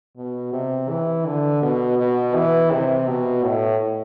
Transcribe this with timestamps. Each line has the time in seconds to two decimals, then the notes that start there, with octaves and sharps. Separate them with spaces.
0.17 B2
0.53 C3
0.89 E3
1.26 D3
1.62 B2
1.99 B2
2.35 E3
2.72 C3
3.08 B2
3.44 A2